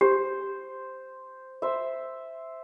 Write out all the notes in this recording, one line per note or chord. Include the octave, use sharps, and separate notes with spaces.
G4 C5
C5 E5